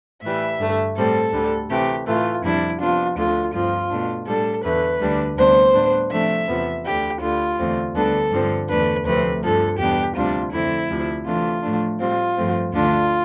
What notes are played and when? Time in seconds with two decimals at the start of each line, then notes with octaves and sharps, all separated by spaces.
0.22 A2 E3 G3 E5
0.59 G2 D3 A3
0.97 A2 G3 C4 A4
1.33 D2 D3 G3
1.69 C3 E3 A3 G4
2.06 A2 E3 A3 F4
2.43 F2 C3 G3 D4 E4
2.80 C3 F3 B3 D4 F4
3.17 D2 D3 F3 F4
3.53 G2 F3 C4 F4
3.90 B2 A3 D4
4.27 A2 G3 D4 A4
4.64 E2 D3 A3 B4
5.01 D2 D3 G3 D4
5.37 D2 C3 G3 B3 D4 C5
5.74 A2 G3 B3 D4
6.11 C3 F3 A3 D4 E5
6.48 E2 C3 F3 B3
6.85 D2 D3 G3 G4
7.21 D2 D3 G3 F4
7.59 E2 D3 A3 C4
7.95 D2 D3 G3 B3 D4 A4
8.31 G2 D3 F3 C4
8.69 E2 D3 A3 D4 B4
9.06 D2 C3 F3 A3 C4 B4
9.43 G2 D3 F3 A4
9.79 E2 B2 G3 B3 D4 G4
10.16 D2 C3 G3 D4 F4
10.52 F2 D3 A3 C4 E4
10.90 D2 C3 F3
11.26 C3 E3 A3 D4 F4
11.63 A2 F3 A3 D4
11.99 A2 G3 C4 F4
12.37 G2 F3 A3 C4
12.73 D2 D3 A3 D4 F4